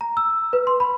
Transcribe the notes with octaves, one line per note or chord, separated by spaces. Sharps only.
A#5
E6
B4
C6
B5